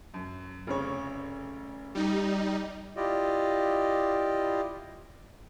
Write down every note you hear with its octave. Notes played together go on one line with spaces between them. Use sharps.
F#2
F1 C#3 C#5
G3 D#4
E4 F4 G4 D5 D#5